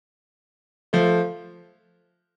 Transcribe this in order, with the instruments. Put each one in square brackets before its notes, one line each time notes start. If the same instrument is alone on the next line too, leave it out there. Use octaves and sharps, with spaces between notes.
[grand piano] F3 A3